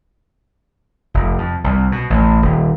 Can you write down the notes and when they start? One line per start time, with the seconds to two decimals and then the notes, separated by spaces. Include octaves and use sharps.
1.14 F1
1.38 F2
1.64 C2
1.92 B2
2.10 A1
2.42 D#1